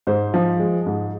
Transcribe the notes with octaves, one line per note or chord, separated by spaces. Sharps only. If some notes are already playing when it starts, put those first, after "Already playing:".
G#2 C5
F3
G#3
G#2